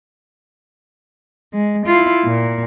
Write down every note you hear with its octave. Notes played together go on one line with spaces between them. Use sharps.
G#3
E4 F4
A#2